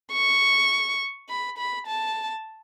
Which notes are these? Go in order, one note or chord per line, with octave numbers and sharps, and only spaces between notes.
C#6
B5
B5
A5